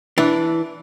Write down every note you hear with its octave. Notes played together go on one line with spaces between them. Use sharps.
E3 D4